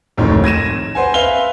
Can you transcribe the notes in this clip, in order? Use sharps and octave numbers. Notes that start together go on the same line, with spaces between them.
D1 F2 G#2 D#3 A3 C#5
G#6 A#6 D#7 E7
B4 C5 F#5 G#5
B4 E5 F5 F7 G7